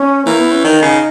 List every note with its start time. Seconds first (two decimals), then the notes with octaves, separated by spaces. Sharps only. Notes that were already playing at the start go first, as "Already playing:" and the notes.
Already playing: C#4
0.25 E3 A#3
0.38 B3
0.51 C#4
0.64 D#3 D#4
0.82 C#3